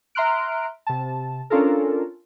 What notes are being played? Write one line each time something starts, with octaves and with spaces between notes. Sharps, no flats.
E5 A#5 C6 F6 F#6 D7
C3 A5
C#4 D4 F4 A4 A#4